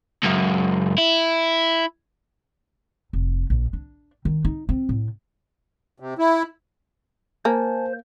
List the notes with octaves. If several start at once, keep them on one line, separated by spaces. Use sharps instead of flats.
C#2 F#2
E4
F1
A#1
D4
D#3
D#4
C4
A2
C3
E4
A#3 C5 G#5 A5